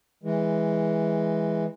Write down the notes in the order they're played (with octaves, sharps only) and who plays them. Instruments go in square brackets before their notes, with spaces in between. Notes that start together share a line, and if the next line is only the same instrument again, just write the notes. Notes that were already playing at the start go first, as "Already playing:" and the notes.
[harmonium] E3 G#3